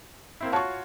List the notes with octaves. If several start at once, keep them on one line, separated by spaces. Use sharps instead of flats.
A#3 C4 E4
F4 F#4 C#5 A5 C#6